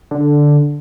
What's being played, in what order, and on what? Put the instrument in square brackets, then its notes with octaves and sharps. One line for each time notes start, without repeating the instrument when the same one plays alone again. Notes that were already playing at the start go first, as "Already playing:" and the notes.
[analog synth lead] D3